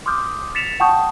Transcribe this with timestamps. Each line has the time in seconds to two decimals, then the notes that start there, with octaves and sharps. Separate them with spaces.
0.06 C6 D6 D#6 F6 G6
0.55 A6 B6 C#7 E7 F7
0.80 F#5 G5 A5 C#6 D#6 G6